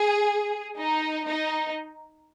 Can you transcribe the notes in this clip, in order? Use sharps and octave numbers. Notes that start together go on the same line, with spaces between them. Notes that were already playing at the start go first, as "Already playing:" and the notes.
Already playing: G#4
D#4
D#4